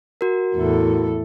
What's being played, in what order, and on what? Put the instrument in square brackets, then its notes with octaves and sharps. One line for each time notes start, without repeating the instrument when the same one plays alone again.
[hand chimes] F#4 A#4
[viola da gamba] E2 A2 A4